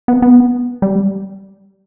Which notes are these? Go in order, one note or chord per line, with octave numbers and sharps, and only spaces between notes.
B3
B3
G3